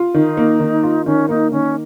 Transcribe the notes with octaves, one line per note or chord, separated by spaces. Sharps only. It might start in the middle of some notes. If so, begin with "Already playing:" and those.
Already playing: F4
D#3 D#4
A#3
D#3
F4
D#3 C#4
A#3 D#4
D#3 C#4